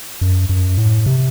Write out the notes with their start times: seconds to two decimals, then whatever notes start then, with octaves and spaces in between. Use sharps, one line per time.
0.21 F#2
0.49 F#2
0.77 A2
1.06 C3